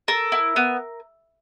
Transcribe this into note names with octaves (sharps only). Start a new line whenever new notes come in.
A4 A#4
E4
B3